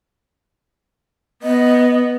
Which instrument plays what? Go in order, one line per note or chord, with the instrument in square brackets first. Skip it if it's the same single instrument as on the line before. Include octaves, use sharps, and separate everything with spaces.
[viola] B3 [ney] D#5